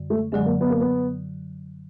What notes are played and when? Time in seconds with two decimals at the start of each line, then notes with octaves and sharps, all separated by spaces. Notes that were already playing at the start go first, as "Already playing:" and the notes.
Already playing: F#2 D3 G3
0.10 A3
0.32 F#2 D3 F#3 G#3
0.45 A#3
0.61 B3
0.70 A#3
0.80 B3